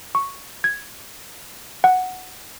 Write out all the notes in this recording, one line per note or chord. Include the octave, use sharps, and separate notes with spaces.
C#6
G#6
F#5